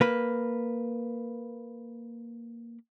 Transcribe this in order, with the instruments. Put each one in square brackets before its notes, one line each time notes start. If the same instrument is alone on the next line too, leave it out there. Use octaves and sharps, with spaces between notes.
[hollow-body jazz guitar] A#3 B4